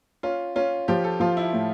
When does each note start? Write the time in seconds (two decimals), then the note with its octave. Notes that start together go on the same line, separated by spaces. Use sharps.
0.23 C#4 F4
0.56 C#4 F4
0.88 F3 G4
1.04 A4
1.20 F3 F4
1.37 E4
1.53 A2